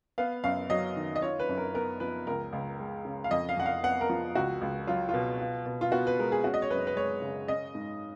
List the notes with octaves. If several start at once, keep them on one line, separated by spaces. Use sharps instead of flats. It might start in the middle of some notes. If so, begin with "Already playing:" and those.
B3 F5
F#2 F5
F#3 D#5
D#3
D#5
F4 C#5
B4
F#2
A#4
B3 A#4
F3 B4
C#2 A#4
C#2
G#3
C#3
F5
F2 D#5
F5
F2 F#5
F5
B3 F#5
A#4
F3
C#2 F#4
C#2
F#3 F4
F4
B2
F4
B2
F4
B3 F#4
B4
G#3 A#4
G#4
C#4 F#4
D#5
C#5
F#2 B4
B4
G#3 C#5
C#3
C#4 D#5
G#2